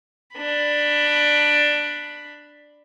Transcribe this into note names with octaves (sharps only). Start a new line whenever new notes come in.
D4 B5